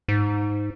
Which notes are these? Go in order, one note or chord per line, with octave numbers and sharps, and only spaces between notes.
G#2